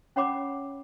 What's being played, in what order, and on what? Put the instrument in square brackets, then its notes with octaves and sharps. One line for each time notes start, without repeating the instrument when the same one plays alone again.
[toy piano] C#4 C#5 F#5 B5 D6